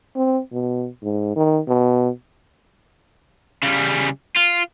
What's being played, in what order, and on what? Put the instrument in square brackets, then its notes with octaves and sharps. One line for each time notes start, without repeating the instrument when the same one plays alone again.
[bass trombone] C4
B2
G#2
D#3
B2
[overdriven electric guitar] C#3 G3
F4